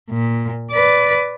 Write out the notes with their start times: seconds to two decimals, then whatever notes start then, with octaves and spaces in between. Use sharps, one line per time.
0.10 A#2
0.72 B4 D5